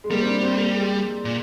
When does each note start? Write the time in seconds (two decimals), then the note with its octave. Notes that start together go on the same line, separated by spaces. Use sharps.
0.04 G#3
0.10 G3 A#3
0.20 C4
0.26 D4
0.41 C4
0.57 A#3
0.73 G#3
1.25 A#2